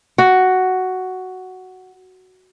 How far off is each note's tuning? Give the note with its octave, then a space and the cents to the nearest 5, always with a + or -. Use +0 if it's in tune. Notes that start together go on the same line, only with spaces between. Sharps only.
F#4 +5